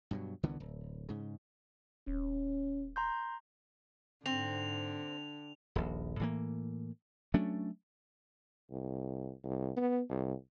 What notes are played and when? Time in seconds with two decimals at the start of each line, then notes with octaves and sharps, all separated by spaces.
0.11 G2 B2 F#3
0.43 C2 D3 E3 B3
0.60 D1
1.09 G#2 C#3
2.07 D#1 C#4
2.96 A#5 C6 G6
4.26 G#2 D3 C4 F7
5.75 D#1 A#1
6.20 A2 E3 A#3
7.34 F#3 A3 C#4 D4
8.71 C2
9.44 C2
9.77 B3
10.10 C2